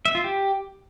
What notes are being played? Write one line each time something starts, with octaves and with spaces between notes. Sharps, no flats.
E5
F4
G4